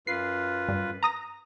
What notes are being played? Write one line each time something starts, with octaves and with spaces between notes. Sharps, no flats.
F#2 F4 B4 C7
G2
A#5 D#6 A#6